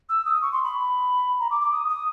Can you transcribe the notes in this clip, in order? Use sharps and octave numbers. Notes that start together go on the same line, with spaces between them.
E6
D#6
C#6
C6
B5
A#5
D6
D6
D#6
D#6